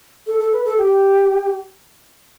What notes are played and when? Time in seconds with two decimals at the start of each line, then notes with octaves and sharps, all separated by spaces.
0.27 A4
0.40 A4
0.52 B4
0.65 A4
0.78 G4